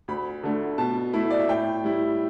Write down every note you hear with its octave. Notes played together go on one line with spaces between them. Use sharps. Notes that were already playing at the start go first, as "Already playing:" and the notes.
D2 B5
D3 A3
B2 A5
A3 E4
D5
E5
A2 G5
G3 E4